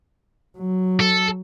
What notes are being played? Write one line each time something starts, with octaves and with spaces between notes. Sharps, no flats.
F#3
A4